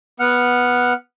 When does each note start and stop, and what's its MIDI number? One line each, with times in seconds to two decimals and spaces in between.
0.20 0.93 59
0.20 0.93 78
0.20 0.93 89